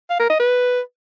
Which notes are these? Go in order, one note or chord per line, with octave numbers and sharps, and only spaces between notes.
F5
A#4
D#5
B4